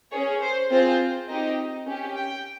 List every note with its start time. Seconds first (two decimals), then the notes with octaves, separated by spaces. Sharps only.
0.12 C#4 G#4 C#5
0.42 C5
0.70 C4 F4 G#4 C5
1.29 C4 D#4 G4 D#5
1.87 C#4 G4
2.16 G5